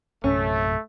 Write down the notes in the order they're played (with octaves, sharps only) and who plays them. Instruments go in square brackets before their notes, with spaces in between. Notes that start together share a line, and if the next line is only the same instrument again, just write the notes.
[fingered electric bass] A#1 F#2 C3 [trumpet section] A3 [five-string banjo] C#4